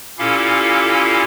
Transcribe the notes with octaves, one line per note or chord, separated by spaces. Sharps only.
A#2 C#4 E4 G4 A4 F5